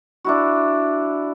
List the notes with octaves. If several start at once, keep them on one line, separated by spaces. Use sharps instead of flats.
D4 E4 F#4